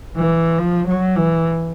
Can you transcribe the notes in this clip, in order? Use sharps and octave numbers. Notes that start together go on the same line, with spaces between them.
E3
F3
F#3
E3